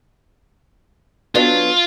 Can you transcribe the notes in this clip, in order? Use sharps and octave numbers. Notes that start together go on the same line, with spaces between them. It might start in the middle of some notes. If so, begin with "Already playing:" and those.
F#3 B3 D4 F4